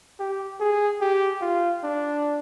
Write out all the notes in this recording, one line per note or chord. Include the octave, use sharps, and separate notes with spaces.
G4
G#4
G4
F4
D4